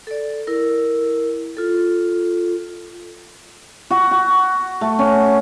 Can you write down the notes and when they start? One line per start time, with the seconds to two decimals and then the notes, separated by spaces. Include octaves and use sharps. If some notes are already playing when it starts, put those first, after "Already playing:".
0.07 A4 D5
0.47 E4 A#4
1.57 F4 A4
3.91 F#4
4.11 F#4
4.81 A3
4.99 C#4